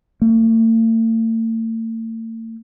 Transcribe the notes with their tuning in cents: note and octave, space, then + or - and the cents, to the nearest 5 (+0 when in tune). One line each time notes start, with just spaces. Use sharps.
A3 +45